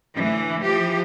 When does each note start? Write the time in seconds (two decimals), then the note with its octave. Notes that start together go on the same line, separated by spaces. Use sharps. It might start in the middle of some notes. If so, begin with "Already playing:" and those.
0.16 D2 A2 E3
0.63 E3 F3 G4